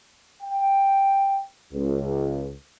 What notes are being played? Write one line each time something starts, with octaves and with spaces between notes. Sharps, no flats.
G5
C#2